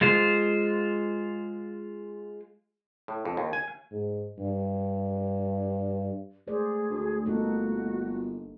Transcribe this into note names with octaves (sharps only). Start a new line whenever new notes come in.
G#3 F4 C5
A2
F2
D#2
G#5
G#2
G2
G#3 A3 G#4 C5 D5
D2
G1 A#3 D#4 F#4 A4